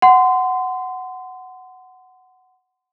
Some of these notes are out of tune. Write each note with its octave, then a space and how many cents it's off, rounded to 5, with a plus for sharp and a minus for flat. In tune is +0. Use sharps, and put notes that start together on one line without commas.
F#5 +5 C6 -25